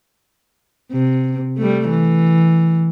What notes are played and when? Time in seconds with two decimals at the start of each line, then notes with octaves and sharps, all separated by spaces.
0.93 C3
1.58 G3 A3
1.89 E3